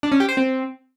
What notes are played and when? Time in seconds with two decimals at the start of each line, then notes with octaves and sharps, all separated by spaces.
0.03 D4
0.12 C#4
0.20 G4
0.29 C5
0.37 C4